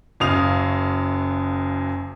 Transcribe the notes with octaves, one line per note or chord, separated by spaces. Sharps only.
F#1 F#2 F5 D#6 F7